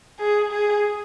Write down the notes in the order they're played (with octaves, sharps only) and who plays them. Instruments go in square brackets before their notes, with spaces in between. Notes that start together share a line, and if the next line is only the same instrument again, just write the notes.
[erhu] G#4
G#4